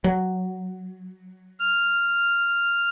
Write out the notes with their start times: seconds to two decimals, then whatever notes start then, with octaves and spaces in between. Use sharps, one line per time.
0.04 F#3
1.60 F6